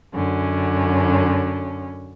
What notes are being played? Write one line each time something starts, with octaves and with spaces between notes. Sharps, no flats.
F#2 D3 C#4